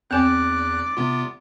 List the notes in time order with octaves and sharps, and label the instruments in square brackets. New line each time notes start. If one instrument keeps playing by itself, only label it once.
[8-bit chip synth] E2 F#6 [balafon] C4 G#5 [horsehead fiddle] D5
[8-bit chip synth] C3 B3 F4